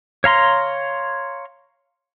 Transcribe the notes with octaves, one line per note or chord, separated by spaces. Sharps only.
C#5 F5 A#5 C6